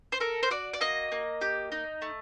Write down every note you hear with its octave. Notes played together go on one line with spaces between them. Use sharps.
C5
A4 A#4
C5
F#4 D5
D5
A#3 D#5
A#3
G4
D#4
A3